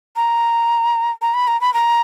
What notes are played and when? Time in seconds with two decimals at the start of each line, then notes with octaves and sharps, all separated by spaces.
0.16 A#5
1.22 A#5
1.34 B5
1.47 A#5
1.61 B5
1.74 A#5